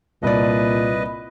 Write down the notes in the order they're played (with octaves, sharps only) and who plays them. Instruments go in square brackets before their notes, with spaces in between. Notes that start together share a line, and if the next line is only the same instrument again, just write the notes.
[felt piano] C2 D5 [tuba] A#2 [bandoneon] B4 D#5